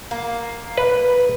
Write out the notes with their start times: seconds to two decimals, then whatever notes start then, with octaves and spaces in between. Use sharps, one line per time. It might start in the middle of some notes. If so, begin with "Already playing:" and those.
0.11 A#3
0.78 B4